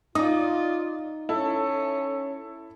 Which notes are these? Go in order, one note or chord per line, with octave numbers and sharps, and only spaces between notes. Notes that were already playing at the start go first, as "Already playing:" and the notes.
D#4 F4 D5 D#6
C#4 E4 A4